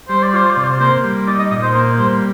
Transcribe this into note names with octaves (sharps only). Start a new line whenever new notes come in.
G3 C5
D5
F4 C5
D5
C3
C5
A#3 C5
G3
D#4 D5
D#5
A#2 D#5
C5
A#3 C5
G3 C5